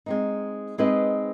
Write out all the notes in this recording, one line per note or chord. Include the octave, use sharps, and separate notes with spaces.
G#3 C4 D#4
G#3 C4 D#4 B4 D#5